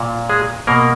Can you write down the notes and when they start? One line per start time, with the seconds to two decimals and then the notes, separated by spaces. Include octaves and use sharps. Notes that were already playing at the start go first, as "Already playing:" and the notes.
Already playing: A#2
0.29 G#3 G#4
0.67 B2 A#3 A#4